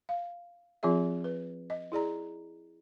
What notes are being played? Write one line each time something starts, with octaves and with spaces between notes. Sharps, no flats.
F5
F3 C4 F4 G#4 E5
B4
D#5
E4 G#4 D5 A#5